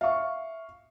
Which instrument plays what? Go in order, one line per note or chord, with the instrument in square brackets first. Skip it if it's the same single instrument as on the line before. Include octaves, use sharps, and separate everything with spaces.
[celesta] E5 [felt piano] F5 C#6